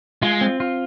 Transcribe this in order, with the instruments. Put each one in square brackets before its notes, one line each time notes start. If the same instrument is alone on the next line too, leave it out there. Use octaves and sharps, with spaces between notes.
[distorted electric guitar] G#3 [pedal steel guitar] F4
[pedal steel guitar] C4
F4